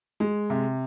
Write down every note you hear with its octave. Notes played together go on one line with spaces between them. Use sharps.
G#3
C3